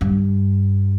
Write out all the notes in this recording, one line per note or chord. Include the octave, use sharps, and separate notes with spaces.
G2